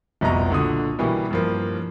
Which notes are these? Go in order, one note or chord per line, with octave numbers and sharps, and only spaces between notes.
F1 C2 B2 D#5 A#5
A#2 D3 F#4 D#6
B2 E3 G3 A#3 B3
G2 F3 A#3